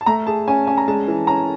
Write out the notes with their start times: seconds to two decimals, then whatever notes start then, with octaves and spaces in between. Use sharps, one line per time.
0.01 A5
0.06 A3 A#5
0.27 G#4 A5
0.47 C#4 G#5
0.67 C#4 G#5
0.77 A#5
0.88 G#3 A5
1.08 E3
1.27 C#4 A#5